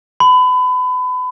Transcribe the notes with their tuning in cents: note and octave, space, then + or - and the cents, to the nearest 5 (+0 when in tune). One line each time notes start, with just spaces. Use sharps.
B5 +30